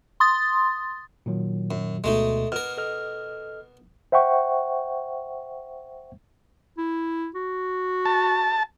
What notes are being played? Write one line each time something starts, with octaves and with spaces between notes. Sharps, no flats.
C6 D#6 A6
A#2 D#3 F#3
F#2
D2 B2 G#3 A3 D#4
B2 A#4 F6
A4 D#5 F6
C5 E5 F#5 G5 C#6
E4
F#4
A5